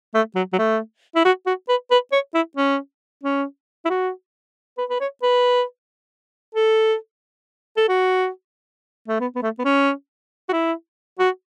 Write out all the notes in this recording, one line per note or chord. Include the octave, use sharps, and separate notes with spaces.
A3
F#3
F#3
A3
E4
F#4
F#4
B4
B4
C#5
E4
C#4
C#4
E4
F#4
B4
B4
C#5
B4
A4
A4
F#4
A3
B3
B3
A3
B3
C#4
F#4
E4
F#4